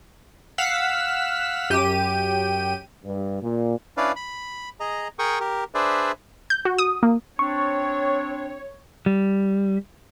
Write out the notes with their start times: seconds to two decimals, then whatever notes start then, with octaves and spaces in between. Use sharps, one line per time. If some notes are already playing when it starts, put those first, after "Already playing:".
0.58 F5 F#5 E6 B6
1.70 F#2 G4 D#7
3.05 G2
3.42 A#2
3.97 C#4 D4 E4 B4 D5 F5
4.16 B5
4.80 G#4 D#5 A#5
5.19 G#4 A#4 G5 C#6 D#6
5.40 G4 A#4
5.75 D4 G#4 B4 C5 D5 E5
6.50 G6
6.65 F#4
6.78 D#6
7.03 A#3
7.39 C4 D4 C#5 C#6
9.06 G3